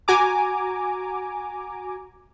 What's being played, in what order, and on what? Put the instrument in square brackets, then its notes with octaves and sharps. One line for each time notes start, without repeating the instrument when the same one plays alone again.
[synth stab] F#4 G#5 A#5 D6